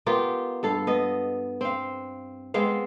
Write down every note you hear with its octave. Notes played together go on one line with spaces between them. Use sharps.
B3 F4 G4 A#4
G2 A4 F5
B3 D#5
C4 F5
G#3 B3 C4 F5